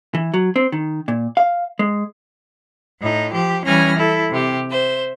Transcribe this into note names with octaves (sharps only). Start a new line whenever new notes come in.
E3
F#3
C4
D#3
A#2
F5
G#3
A2 D#4
F3 G4
E3 G3 C#4 G#5 F6 A#6
E4 A4
C3 G4
C5 E5